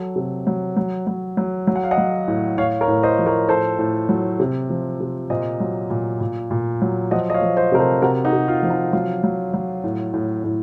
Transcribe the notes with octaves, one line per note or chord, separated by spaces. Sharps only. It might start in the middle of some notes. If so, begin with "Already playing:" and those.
Already playing: F#3 A4
C3
F#3
F#3
F#3
F#3
F#3
F#5
F5
D#5 F#5
F#3
A2
A2 C#5 F5
A#4 C#5
A2
C5 D#5
F3
A#4 C#5
A2 A4 C5
A2
F#3
C3
F3
C3
A#2 C5 D#5
F#3
A#2
A#2
A#2
F#3
F3 D#5 F#5
D#5
C#5 F5
F3
C5 D#5
C3 A#4
A4 C5
C3 F#4 A#4
D#4 F#4
C3
F4
F3
D#4
F#3 F4
F#3
F#3
A2
A2
A2